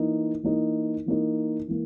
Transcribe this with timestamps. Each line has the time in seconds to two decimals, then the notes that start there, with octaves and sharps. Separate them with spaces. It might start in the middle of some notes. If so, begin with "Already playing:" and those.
Already playing: E3 A#3 D#4
0.43 E3 A#3 D#4
1.06 E3 A#3 D#4
1.68 E3 A#3